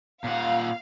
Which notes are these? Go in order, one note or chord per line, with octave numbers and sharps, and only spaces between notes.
A#2 F5 F#5